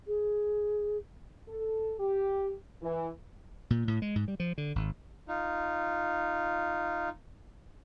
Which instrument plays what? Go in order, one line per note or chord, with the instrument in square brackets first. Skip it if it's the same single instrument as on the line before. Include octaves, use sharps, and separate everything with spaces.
[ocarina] G#4
[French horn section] A4
G4
E3
[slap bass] A#2
A2
G#3
G#2
G3
F3
D3
G#1
[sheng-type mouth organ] D#4 F4